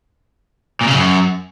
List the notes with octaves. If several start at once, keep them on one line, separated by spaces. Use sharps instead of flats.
A#2
C#3
F#2